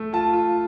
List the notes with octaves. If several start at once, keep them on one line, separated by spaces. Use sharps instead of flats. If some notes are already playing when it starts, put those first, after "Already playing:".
Already playing: A3
F4 A5
F4